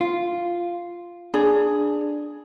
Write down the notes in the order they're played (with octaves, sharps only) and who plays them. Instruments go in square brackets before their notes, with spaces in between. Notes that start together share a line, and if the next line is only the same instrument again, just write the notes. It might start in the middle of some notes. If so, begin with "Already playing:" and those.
[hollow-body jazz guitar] F4
[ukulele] D4 G#4